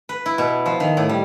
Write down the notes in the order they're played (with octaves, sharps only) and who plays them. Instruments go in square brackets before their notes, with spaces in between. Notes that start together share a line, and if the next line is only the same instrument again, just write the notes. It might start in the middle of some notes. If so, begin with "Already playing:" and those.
[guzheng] B4
E4
B2
F3
D#3
A2
G3